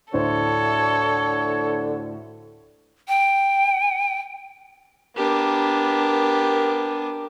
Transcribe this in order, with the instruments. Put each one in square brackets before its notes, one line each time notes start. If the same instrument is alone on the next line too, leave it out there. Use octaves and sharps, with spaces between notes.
[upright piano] D2 A2 C5 [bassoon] D3 [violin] A4 [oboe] C#5
[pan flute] G5
[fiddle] B3 D4 [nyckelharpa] G4 A#4